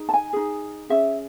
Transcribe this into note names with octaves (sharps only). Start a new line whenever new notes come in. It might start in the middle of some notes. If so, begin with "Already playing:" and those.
Already playing: D#4 G#4
A5
G#5
D#4 G#4
C#4 G#4 E5